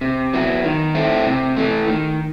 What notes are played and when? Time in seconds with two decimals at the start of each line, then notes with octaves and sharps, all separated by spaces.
0.01 C3
0.33 F#3 B3 E4
0.64 D#3
0.95 A3 C4 E4
1.26 C3
1.56 E3 A3
1.88 D#3